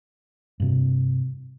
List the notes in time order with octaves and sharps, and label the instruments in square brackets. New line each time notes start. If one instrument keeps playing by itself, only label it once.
[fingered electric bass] G2 C3